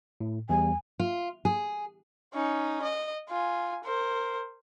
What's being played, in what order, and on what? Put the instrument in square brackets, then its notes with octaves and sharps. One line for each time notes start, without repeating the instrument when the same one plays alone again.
[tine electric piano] A2
[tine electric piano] E2 G3 [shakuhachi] G#5
[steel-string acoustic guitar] F4
G#4
[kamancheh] C#4 D#4
D#5
F4 G#5
A#4 C5